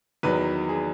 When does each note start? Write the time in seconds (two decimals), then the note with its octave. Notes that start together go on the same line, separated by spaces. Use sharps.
0.23 E2 D#3 F#3 B4
0.69 G#4